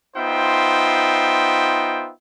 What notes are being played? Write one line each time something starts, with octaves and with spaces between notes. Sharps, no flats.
B3 D#4 F4 C5 E5 G5